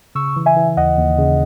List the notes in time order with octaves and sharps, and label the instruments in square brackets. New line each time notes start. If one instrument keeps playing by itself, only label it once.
[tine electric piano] C#3 [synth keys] C#6 E6
[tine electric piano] E3
[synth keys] E5 G#5
[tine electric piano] E3
[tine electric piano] D#2 [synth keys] D#5 F#5
[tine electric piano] D#2
C#3